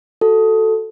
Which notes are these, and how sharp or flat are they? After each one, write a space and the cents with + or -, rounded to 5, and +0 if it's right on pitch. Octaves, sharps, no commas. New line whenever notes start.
F#4 +0 A4 +0